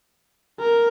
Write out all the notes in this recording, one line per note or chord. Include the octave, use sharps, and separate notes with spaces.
A#4